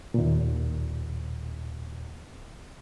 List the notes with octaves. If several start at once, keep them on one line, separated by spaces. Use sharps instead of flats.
D#2 A#2